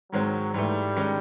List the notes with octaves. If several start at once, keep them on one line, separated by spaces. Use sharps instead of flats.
G#2 D#3 F#3 G#3 C4
G#2 E3 G3 A3
D#3 G#3 C#4